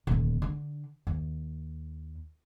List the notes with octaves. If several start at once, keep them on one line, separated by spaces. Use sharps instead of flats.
D#1 D2
D3 D4
D#2